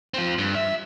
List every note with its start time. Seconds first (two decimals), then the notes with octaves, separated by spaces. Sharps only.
0.14 C4 F4
0.39 G2
0.55 E5